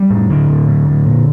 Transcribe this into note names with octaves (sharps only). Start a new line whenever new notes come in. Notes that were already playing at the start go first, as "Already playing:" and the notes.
Already playing: G3
A2
A2 D3
A2
A2
A2
A#2